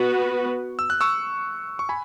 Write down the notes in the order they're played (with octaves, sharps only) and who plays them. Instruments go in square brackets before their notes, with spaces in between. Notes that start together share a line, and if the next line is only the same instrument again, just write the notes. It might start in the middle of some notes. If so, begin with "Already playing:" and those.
Already playing: [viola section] B3 F#4 B4 [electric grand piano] C#6
[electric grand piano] E6
F#6
C#6 E6
C#6
G#5 B5